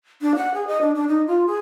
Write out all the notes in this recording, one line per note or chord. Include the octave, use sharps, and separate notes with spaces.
D4
F#5
G#4
D#5
D4
D4
D#4
F4
G#4